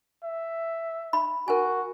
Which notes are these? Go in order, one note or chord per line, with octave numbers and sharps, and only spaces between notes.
E5
B5
F#4 A#4 G#5